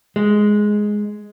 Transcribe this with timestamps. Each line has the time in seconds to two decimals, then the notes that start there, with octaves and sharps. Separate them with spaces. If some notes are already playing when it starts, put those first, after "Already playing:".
0.16 G#3